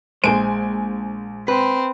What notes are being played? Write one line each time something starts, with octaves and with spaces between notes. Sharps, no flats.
A#1 G#3 C5 G#5 D7
C4 B4